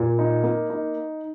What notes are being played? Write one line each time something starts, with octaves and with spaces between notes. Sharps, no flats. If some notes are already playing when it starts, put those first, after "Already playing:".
Already playing: A#2
D#4
A#3
D#4